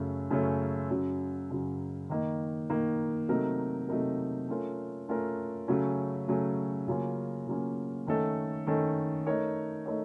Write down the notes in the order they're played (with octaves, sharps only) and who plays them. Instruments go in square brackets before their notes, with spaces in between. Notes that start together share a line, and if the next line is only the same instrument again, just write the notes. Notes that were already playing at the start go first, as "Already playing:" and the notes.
Already playing: [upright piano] F#2 C#3 A3 C#4
F#2 C#3 A3 C#4
F#2 C#3 F#3
F#2 C#3 F#3
D#3 A#3 D#4
D#3 A#3 D#4
C3 F#3 A3 D#4 A#4
C3 F#3 A3 D#4 A#4
A3 C#4 F4 A#4
A3 C#4 F4 A#4
C#3 F#3 A3 C#4
C#3 F#3 A3 C#4
C#3 F#3 A#3 C#4 F4
C#3 F#3 A#3 C#4 F4
D#3 A3 C#4 A4
D#3 A3 C#4 A4
A3 D#4 A#4 C#5
A3 D#4 A#4 C#5